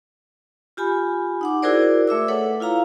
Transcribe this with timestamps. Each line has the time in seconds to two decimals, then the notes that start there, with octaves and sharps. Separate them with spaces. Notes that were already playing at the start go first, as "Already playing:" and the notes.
0.77 F4 G4 G#5 B5
1.41 D#4 F#5 D6
1.62 E4 F#4 G#4 A#4 C5 D5
2.08 A3 E5 D6 E6
2.28 A4 B4 C#5 F#5
2.60 E4 F4 F5 A#5